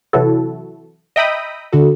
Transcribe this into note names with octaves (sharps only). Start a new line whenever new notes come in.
C3 E3 F#3 E4 F#4 A4
D#5 E5 G5 A#5 B5 D#6
D3 F#4 A4